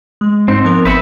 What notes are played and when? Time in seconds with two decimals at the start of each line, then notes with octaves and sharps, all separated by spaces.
0.21 G#3
0.48 G#2 C4 D#4
0.64 F3 B3 A#4
0.85 G#1 C4 B4 E5 B5 C#7